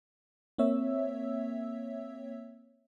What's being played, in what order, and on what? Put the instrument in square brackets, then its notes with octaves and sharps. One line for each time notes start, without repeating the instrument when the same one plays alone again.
[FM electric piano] A#3 C4 C#5 E5 E6